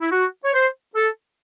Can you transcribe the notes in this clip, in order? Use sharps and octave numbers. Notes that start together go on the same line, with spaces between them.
E4
F#4
C#5
C5
A4